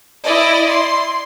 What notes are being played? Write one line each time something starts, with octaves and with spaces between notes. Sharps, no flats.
E4 D5 D#5
C6